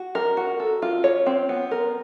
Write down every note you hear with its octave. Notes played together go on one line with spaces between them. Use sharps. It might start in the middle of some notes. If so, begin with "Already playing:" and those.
Already playing: F#4
A#4
F#4
A4
F4
C#5
C4
B3
A#4